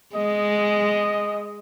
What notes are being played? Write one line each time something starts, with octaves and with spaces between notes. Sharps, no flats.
G#3 D#5